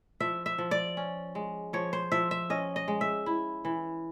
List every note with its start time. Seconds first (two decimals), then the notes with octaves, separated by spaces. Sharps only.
0.20 F3 E5
0.46 E5
0.58 F3
0.71 D5
0.97 C#4
1.35 G#3
1.73 F3 C#5
1.93 C5
2.12 F3 E5
2.31 E5
2.50 C#4 D#5
2.76 D#5
2.88 G#3
3.01 E5
3.26 E4
3.65 E3